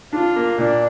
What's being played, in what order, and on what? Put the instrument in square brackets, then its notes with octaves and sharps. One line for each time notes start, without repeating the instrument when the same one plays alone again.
[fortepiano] D4 [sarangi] F4
[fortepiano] A#3
[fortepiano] A#2 [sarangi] D4